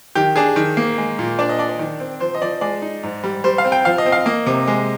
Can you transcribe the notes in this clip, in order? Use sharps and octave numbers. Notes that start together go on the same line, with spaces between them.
D#3 G4
D4 G#4
D#3
A#3
G#3
A#2
D4 D5
D#5
D4 D5
D5
D#3
C4
F3 C5
D#5
F3 D5
G#3 D5
D#4
G#2
G3
G3 C5
F5
C4
G5
F3 F5
D#5
C4
F5
A#3 D#5
C3
G#3